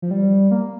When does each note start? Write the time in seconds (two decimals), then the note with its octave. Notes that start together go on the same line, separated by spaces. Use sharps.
0.02 F3
0.11 G3
0.51 A#3